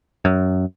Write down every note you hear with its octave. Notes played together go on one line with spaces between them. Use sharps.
F#2